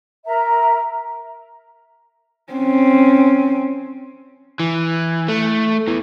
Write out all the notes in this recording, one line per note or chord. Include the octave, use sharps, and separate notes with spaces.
A#4 E5 A#5
C4 C#4
E3
A3
E2 E3